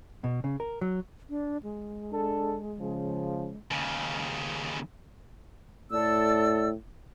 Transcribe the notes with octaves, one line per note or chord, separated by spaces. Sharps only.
B2
C#3
A#4
F#3
D4
G#3
D4 A4
C#3 F3
D#2 C#3
A2 A4 D5 E6